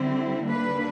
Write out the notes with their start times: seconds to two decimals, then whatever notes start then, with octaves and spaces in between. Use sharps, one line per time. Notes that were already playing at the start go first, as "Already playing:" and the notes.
Already playing: D3 G3 C4 E4
0.46 D#2 D3 G3 A#3 D4 B4